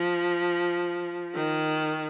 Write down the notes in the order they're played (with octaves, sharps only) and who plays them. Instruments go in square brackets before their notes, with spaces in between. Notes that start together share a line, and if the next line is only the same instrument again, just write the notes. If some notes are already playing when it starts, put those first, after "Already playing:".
Already playing: [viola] F3
D#3